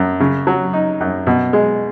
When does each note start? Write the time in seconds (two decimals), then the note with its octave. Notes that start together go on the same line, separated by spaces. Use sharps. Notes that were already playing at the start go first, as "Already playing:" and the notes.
Already playing: F#2
0.20 C#3
0.47 F#3
0.73 D#4
1.00 F#2
1.27 B2
1.53 G#3